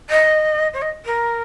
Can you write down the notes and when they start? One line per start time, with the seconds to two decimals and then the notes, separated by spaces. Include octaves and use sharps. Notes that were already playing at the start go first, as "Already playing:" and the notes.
0.09 D#5
0.73 C#5
0.81 D#5
1.05 A#4